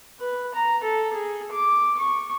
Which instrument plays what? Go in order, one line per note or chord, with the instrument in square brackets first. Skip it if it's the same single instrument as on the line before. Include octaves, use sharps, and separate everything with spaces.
[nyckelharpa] B4
A#5
A4
G#4
D6
C#6